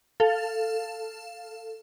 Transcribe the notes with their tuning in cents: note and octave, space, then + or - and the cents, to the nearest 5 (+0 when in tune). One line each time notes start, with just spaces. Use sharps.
A4 +10 F5 +0